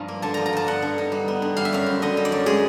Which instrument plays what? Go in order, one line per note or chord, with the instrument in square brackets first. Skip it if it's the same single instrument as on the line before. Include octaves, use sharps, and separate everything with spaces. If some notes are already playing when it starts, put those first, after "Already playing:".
Already playing: [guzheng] G2 F3 A#5
A#3
D3 A5
F3 A#5
A#5
G2 A5
B3 F#5
D3
D#4
G3
B3
D3
G3 F5
E5
F#2 F5
C4
D3 D#5
G3
D5
F#2
G#3 G#4